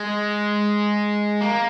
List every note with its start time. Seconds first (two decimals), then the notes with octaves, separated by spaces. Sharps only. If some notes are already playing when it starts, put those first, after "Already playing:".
Already playing: G#3
1.41 A#3